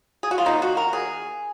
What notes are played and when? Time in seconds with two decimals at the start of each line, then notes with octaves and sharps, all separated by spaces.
0.23 G#4
0.31 F#4
0.38 F4
0.46 D#3 A#3 D#4
0.62 F#4
0.77 A#4
0.93 G#4